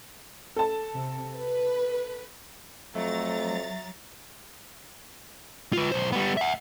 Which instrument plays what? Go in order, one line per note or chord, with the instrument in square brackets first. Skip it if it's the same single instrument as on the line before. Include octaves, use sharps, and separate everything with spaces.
[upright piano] A4 A5
[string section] C3
B4
[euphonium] F2 [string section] F#3 A#5 A6 [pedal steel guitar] A3 [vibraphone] E5
[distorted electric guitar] F4 B4
B1 C5
G3 B3
E5 F#5